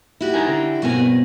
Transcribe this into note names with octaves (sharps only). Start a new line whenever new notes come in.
E4 F#4 G4
D#4 A#4 G#5
D3
G2 B2 C4 F#4 A#4 G#5